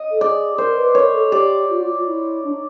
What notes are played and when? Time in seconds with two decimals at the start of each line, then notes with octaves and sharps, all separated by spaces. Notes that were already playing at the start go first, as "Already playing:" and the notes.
Already playing: D#5
0.11 A4
0.20 G#4 D5
0.58 A#4 C5
0.77 B4
0.95 A#4 C#5
1.14 A4
1.32 G4 D5
1.70 F4
1.77 F#4
1.84 F4
1.98 F4
2.06 E4
2.44 D4
2.51 D#4